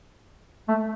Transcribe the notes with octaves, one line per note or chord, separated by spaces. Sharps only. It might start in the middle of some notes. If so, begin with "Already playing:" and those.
A3